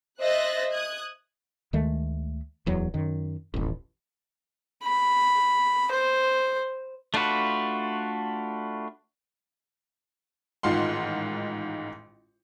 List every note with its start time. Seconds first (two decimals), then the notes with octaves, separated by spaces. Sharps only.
0.19 C5 D#5 E5 F#6 A6 A#6
0.71 D#6 F#6 G#6
1.73 D2 D#3 G#3 A3
2.66 D1 E2 F#3
2.94 F#2 D#3
3.54 D#1 A1
4.84 B5
5.92 C5
7.14 A3 D4 F4 F#4 B4
10.63 A1 G#2 D#3 F4 F#5 C6